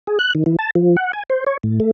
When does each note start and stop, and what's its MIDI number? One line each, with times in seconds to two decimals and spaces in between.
0.07 0.19 68
0.19 0.33 90
0.35 0.44 51
0.46 0.56 52
0.59 0.70 81
0.75 0.96 53
0.97 1.12 78
1.13 1.23 80
1.30 1.44 72
1.47 1.57 73
1.63 1.80 45
1.80 1.91 57